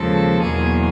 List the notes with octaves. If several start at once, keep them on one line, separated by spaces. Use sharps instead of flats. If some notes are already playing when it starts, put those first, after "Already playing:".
Already playing: D#2 C#3 F3 G#3 A4
E2 B2 F#3 A#3 G#4